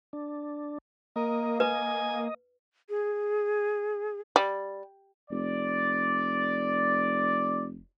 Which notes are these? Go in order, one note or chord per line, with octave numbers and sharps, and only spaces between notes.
D4
A#3 A#4 D#5
B4 G#5
G#4
G3
F1 D5